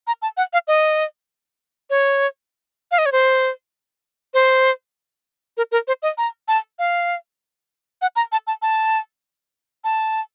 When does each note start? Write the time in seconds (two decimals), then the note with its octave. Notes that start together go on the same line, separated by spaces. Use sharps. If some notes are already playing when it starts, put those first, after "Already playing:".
0.07 A#5
0.22 A5
0.37 F#5
0.53 F5
0.68 D#5
1.90 C#5
2.91 F5
2.98 D#5
3.06 C#5
3.12 C5
4.34 C5
5.57 A#4
5.72 A#4
5.88 C5
6.02 D#5
6.18 A#5
6.48 A5
6.79 F5
8.02 F#5
8.16 A#5
8.32 A5
8.47 A5
8.62 A5
9.84 A5